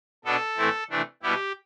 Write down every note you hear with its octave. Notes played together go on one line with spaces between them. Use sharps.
B2 B3 D4 A4
A2 E3 A3 C4 E4
C3 E3 A3 D4
B2 G3 B3 E4 G4